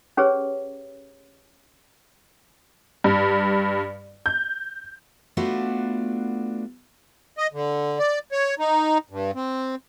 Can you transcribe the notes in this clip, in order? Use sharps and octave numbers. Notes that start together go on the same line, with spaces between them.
C#4 G4 G#4 B4 C#5
G2
G6
A3 B3 D4 F4 F#4
D#5
D3
D5
C#5
D#4
G2
C4